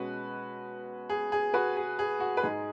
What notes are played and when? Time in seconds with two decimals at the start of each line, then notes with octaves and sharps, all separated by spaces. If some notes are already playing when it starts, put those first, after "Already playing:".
Already playing: B2 G#3 C#4 F#4 B4
1.10 G#4
1.32 G#4
1.54 F#4 B4
1.77 G#4
1.99 G#4
2.20 F#4
2.37 B4
2.43 G#2 G#3 D#4 G#4